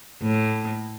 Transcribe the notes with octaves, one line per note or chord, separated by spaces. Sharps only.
A2